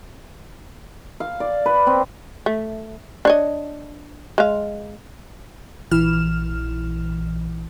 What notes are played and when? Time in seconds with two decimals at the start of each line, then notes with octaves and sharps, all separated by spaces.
1.20 F5
1.40 D5
1.66 B4
1.87 C4
2.46 A3
3.25 D4 C#5 D#5
4.38 G#3 F5
5.91 A#1 E3 F6 E7